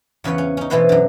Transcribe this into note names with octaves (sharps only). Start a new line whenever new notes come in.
E2 C#3 B4 C#5 F#5
C#4
C#4 D#4
B2 E3 A3 B3 B4 C5
F#2 D3